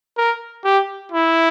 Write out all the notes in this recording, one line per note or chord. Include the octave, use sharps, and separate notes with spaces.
A#4
G4
E4